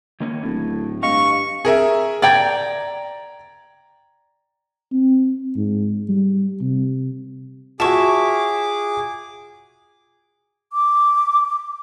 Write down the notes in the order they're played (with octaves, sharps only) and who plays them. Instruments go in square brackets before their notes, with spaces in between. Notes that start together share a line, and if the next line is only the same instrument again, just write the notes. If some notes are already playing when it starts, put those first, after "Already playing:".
[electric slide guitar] D#3 A#3 C#4
[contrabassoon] D1 [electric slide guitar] A2
[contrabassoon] G2 [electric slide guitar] D#5 F5 [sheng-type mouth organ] C#6
[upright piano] G#4 A#4 E5
[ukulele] D5 G5 [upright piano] A#5 G#6 A6
[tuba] C4
G#2
G3
C3
[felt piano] F4 F#4 [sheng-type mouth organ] G#4 D6 [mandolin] C#5 E5 [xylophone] A5 C#6
[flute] D6